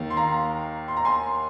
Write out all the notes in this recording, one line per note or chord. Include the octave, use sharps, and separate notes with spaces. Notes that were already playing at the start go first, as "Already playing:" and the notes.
Already playing: D#2 D#3
C6
F5 A#5
C6
A#5
G#5 C6